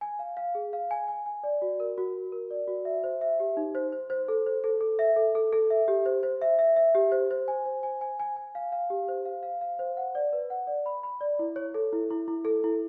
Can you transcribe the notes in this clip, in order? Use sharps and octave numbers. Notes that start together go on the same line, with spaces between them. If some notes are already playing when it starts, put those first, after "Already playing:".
G#5
F5
F5
G#4
F5
G#5
G#5
G#5
D5
F#4
A#4
F#4
F#4
A#4
D5
F#4
E5
C5
E5
G4
D#4
C5
C5
C5
A4
C5
A4
A4
E5
A4
A4
A4
E5
G4
C5
C5
E5
E5
E5
G4
C5
C5
G#5
C5
G#5
G#5
G#5
G#5
F5
F5
G4
C5
F5
F5
F5
C5
F#5
D5
B4
F#5
D5
B5
B5
D5
E4
C#5
A4
E4
E4
E4
A4
E4